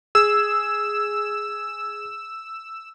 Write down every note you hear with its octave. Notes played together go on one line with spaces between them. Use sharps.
G#4 E6